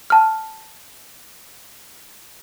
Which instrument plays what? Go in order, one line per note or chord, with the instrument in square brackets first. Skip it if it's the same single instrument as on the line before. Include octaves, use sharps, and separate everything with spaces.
[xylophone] G5 A5 F6